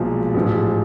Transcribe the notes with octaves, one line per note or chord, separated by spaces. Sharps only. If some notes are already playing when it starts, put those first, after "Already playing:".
Already playing: B1 A#2 F3 G#3
A1 G#2 F3 G#3